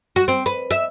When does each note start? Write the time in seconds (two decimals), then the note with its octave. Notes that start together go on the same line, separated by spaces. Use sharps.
0.16 F#4
0.28 C4
0.46 B4
0.71 E5